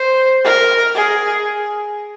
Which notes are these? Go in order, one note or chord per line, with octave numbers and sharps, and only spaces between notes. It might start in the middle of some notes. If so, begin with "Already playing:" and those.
Already playing: C5
A#4
G#4